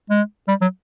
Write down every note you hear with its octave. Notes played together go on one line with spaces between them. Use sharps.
G#3
G3
F#3